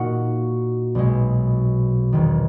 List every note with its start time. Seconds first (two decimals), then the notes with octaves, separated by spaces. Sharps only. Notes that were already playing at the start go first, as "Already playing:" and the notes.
Already playing: A#2 A#3 D#4 F#4
0.95 B1 B2 G#3
2.12 E1 E2 D#3